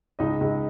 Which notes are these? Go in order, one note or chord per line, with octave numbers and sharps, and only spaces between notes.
C#2 D#4 D#5
C#2